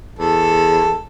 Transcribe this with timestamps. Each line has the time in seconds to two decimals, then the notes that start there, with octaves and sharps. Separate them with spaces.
0.19 E2 A4